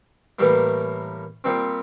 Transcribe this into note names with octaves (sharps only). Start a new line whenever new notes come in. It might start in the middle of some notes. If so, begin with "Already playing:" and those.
A2 E3 G3 A#3
A#2 G3 C4